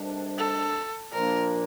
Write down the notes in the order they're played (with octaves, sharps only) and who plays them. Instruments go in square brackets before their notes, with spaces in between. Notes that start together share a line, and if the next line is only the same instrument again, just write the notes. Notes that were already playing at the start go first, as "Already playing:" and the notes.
Already playing: [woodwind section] D2 C3 D#3 G3 D4
[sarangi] A4
[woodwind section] A#2 F3 A#3 D4 [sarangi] A#4